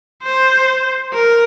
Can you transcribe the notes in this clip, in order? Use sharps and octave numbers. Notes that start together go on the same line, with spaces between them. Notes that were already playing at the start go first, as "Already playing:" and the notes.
C5
A#4